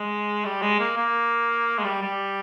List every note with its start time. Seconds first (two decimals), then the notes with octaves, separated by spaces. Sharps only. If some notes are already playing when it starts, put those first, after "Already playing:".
Already playing: G#3
0.45 G3
0.62 G#3
0.80 A#3
0.97 A#3
1.78 G#3
1.84 G3
2.02 G3